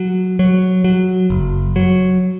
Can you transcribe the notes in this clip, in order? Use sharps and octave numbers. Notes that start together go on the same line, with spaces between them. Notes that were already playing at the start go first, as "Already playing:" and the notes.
Already playing: F#3
F#3
F#3
F#1
F#3